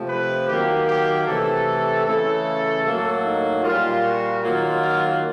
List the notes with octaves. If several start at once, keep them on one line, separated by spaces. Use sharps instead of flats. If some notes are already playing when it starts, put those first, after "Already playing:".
Already playing: C3 F3 A3
B4
D#3 F#3 A#3 G4
G4
C3 E3 A3 A4
C#3 E3 A3 A4
A2 F#3 A#3
D#4
A#2 G3 A#3 F4
F#4
D#3 F#3 A#3 F4
F4